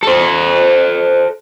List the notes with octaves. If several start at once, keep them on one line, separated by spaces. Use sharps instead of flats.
A4 C5